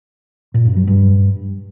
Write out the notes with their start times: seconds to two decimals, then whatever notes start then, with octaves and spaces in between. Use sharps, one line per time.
0.54 A#2
0.65 F#2
0.76 F#3
0.87 G2